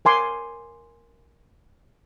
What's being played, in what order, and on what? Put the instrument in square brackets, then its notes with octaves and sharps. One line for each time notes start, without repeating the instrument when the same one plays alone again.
[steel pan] A#4 G#5 C6 D6